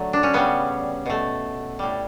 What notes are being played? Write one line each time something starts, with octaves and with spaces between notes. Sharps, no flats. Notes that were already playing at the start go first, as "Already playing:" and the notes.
Already playing: D3 F#3 A3
D4
C#4
C#3 G3 B3
B2 A3
A2 G3